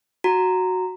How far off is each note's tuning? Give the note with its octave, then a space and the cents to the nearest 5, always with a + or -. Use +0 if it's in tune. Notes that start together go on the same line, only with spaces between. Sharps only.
F#4 +0 A#5 -10